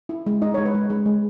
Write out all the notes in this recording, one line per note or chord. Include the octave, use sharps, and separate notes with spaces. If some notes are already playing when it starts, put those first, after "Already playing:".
E4
G#3
D#4 D#5
G#3 C#5
B4
G#3
G#3
G#3